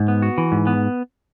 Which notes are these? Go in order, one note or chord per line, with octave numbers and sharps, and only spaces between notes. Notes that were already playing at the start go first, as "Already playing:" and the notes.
Already playing: G#2
B3
F#4
E3
G#2
B3